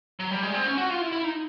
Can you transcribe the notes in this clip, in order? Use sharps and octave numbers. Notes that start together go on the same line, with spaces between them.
F#3
G3
G#3
C4
C#4
F#4
F4
E4
E4
D#4